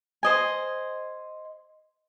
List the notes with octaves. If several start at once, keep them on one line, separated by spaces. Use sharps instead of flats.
C5 D#5 G#5